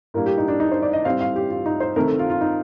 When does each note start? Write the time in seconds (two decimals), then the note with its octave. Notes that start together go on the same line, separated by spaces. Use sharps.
0.14 A2 G3 A#3 D4 A#4
0.26 G4
0.38 D#4
0.48 D4
0.60 D#4
0.71 C5
0.83 D5
0.93 D#5
1.05 A2 G3 C4 F5
1.21 F5
1.36 G4
1.50 F4
1.66 D#4
1.80 C5
1.96 C3 D#3 A3 C4 A#4
2.07 A4
2.19 F4
2.30 F4
2.41 D#4